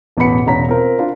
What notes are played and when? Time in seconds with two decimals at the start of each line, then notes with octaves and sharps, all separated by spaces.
0.17 A1 E2 B2 B3 B5 C#7
0.46 E1 C#4 A#5 B6
0.69 C4 F4 A#4
0.99 D4 F4 A#4